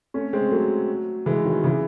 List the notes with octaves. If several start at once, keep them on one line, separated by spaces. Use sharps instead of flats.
A3 C#4
G#3 C4
F#3 A3
E3 G#3
D#3 F#3
C#3 E3